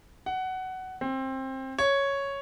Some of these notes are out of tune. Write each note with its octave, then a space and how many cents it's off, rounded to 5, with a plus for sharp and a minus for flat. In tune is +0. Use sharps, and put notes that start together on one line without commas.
F#5 +15
C4 +20
C#5 +0